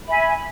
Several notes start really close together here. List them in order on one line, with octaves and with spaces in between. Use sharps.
B5 E5 G#5